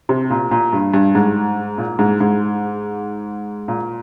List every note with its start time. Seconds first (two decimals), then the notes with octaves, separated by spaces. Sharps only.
0.09 C3
0.30 A#2
0.51 A#2
0.73 G2
0.94 G2
1.15 G#2
1.78 A#2
1.99 G#2
2.20 G#2
3.68 A#2